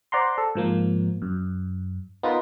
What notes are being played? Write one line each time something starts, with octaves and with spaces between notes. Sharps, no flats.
C5 D5 F#5 A#5 C6
A4
G#2 F3 A#3
F#2
B3 D#4 F4 A#4 B4